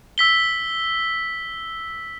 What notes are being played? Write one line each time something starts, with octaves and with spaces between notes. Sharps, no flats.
E6 B6 G7